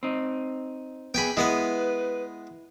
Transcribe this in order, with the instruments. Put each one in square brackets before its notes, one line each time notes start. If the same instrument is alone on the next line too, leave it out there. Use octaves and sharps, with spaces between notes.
[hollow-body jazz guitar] C4 D#4
[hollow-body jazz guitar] B3 G#4 [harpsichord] G5 G#5 B5
[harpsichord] G#3 B3 G#5 [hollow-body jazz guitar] E4 [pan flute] B4